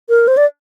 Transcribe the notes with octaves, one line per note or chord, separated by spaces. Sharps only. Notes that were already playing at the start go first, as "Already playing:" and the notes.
A#4
C5
D5